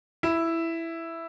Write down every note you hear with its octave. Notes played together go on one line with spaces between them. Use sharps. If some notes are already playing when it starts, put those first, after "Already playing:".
E4